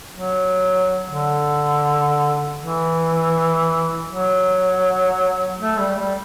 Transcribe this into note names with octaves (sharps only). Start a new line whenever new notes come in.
F#3
D3
E3
F#3
A3
G3
G3